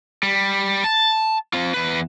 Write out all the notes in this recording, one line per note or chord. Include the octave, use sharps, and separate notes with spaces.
G3
A5
C4 F4
E2 B4